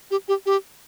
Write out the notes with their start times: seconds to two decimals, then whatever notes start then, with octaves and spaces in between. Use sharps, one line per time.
0.11 G4
0.28 G4
0.46 G4